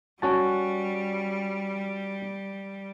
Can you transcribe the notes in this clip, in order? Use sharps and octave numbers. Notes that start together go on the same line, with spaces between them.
G3 C#4 F#4 A5